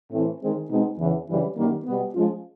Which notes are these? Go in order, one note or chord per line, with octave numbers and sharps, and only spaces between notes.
A2 E3 A3 C4
D#3 G#3 C4
B2 G#3 C4 D#4
E2 C#3 E3
F#2 C#3 E3 G3
F#2 D#3 G3 A#3
B2 G3 B3
F3 G#3 C#4 F4